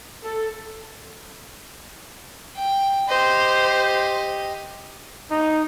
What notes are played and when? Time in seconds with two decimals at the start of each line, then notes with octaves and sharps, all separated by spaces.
0.23 A4
2.56 G5
3.08 G4 C5 D#5
5.31 D#4